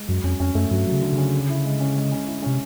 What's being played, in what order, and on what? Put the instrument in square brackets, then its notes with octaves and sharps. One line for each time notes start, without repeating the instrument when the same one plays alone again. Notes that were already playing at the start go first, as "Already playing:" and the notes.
Already playing: [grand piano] G#3
[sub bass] F#2 [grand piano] F#3
[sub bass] F2 [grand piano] C#4
[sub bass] F2 [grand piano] C#4
[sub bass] F#2 [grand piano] A3
[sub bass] G2 [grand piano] F#3
[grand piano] F#3
[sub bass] C#3
[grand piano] D3
[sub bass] C#3
[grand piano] C#4
C#4
E4
G#3
C#4
G#3
C#4
E4
[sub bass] C3 [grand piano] C#4